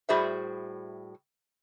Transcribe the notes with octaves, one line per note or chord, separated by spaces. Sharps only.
A2 G3 F#4 G#4 C5 E5